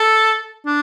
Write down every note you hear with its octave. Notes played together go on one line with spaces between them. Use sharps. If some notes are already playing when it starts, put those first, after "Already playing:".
Already playing: A4
D4